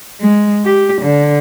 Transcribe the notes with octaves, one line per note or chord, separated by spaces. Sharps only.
G#3
G4
D3